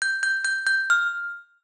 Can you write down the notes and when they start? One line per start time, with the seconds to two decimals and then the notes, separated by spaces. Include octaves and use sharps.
0.02 G6
0.23 G6
0.45 G6
0.67 G6
0.90 F6